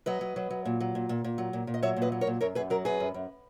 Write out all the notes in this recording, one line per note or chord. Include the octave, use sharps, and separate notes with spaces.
F#3 B4 D#5
F#3
F#3
F#3
A#2
F#3
A#2
A#2
A#2
F#3
A#2
A#2
D#5
F#3 C#5 E5
A#2
B4 D#5
F#3
A#4 C#5
A#2
F#2 A#4 C#5
F#2 G#4 B4
F#3 F#4 A#4
F#2 G#4 B4
F#2
F#2